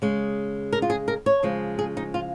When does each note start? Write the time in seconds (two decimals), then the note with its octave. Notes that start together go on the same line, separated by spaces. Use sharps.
0.02 C#3 G#3
0.73 A#4
0.82 F4
0.90 G#4
1.08 A#4
1.26 C#5
1.43 C#3 F3 G#3
1.79 G#4
1.97 D#4
2.14 F4